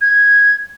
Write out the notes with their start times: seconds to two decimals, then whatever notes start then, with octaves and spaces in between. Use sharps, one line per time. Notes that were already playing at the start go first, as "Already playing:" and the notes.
0.01 G#6